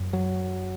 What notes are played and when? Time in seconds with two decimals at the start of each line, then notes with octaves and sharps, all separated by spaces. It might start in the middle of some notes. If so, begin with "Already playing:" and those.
Already playing: F#2
0.13 F#3